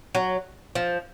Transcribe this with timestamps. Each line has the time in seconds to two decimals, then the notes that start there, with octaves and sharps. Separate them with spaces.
0.15 F#3
0.75 F3